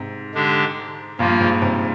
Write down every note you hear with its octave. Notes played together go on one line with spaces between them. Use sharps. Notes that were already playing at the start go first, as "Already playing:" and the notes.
Already playing: G#2 C3
D3 G#3 D4 G4
G2 A#2 F3 A#3 F4
G#2
G#2 C3